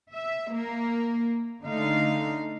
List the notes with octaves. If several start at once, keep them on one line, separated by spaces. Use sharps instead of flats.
E5
A#3
D3 A3 D#4 F5